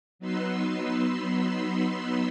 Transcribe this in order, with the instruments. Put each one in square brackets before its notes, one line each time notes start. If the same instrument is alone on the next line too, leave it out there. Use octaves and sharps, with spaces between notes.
[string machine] F#3 B3 D#4 B4 C6 E6